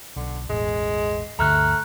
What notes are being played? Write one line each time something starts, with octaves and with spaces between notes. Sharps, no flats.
B1 D3
E1 A1 G#3
D2 G2 D3 A3 A#5 F6 F#6